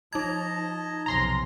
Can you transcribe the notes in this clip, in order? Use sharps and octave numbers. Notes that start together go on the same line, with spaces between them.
F3 D#4 D#5 A5 A#5 G#6
B1 F2 C3 C#4 A#5 C6 A#6